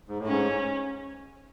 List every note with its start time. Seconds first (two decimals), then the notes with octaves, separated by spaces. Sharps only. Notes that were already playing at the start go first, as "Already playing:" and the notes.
0.08 G#2
0.19 A2
0.26 G#2 C#4